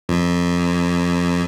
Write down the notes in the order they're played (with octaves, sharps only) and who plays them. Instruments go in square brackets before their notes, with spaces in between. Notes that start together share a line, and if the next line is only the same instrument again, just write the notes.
[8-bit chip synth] F2